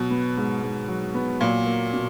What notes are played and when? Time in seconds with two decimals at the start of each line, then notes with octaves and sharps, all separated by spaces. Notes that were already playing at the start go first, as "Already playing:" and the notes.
Already playing: B2 F#3
0.10 B3
0.37 G#2
0.63 G#2
0.88 F#3
1.15 B3
1.41 A#2 F#3
1.66 A#3
1.93 B2